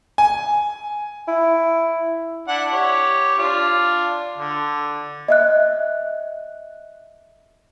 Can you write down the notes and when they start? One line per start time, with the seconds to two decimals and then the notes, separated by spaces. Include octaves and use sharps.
0.18 G#5
1.28 E4
2.48 D4 E4 F#5
2.72 G4 C#5
3.38 D4 F4
4.38 D3
5.28 D#5 E5 F#6